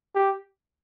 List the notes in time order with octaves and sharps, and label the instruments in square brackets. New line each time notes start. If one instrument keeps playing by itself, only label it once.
[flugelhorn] G4